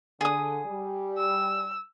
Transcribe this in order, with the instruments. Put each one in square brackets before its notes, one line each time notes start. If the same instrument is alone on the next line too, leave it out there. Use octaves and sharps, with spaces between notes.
[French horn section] D3 [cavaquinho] G#4 D#6
[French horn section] G3
[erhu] E6